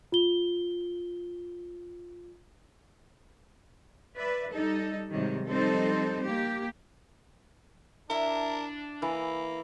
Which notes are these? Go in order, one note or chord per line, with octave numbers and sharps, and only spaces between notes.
F4 G7
B4 D5 E5
G3 D#4 A4
G#2 C3 D#3 F#3 G3
F3 G3 C4 D#4 A4 C5
A#3 G4
D4 E4 A#4 E5
E3 A#3